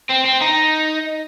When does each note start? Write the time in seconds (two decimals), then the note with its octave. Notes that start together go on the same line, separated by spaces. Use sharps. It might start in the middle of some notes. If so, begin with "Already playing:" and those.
0.09 C4
0.25 C4
0.41 D#4